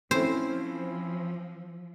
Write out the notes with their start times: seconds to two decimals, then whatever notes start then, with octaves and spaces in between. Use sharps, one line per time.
0.11 F3 C4 C#4 E4 C5